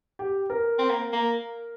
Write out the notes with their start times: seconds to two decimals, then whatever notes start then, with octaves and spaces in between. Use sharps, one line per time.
0.19 G4
0.50 A#4
0.79 C4
0.90 A#3
1.13 A#3